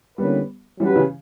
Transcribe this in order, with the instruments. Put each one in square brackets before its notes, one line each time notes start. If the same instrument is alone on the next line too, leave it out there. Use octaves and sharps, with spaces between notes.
[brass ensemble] D3 A#3 C#4 E4 B4 [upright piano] G3 B3
[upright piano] E3 G3 [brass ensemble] F#3 C#4 G4 B4
[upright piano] C#3 E3